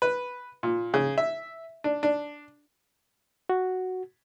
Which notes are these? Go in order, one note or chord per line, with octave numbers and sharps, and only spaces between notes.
B4
A#2
C#3
E5
D4
D4
F#4